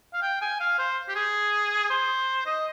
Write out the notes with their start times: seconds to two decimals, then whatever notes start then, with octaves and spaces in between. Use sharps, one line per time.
0.13 F5
0.22 G5
0.41 G#5
0.60 F5
0.78 C5
1.08 G4
1.15 G#4
1.90 C5
2.46 D#5